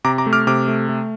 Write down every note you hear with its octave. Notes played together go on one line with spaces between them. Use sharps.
C3 A#5 D6
A#5 D6
A3
D6 F6
C3 D6 F6
A3
A3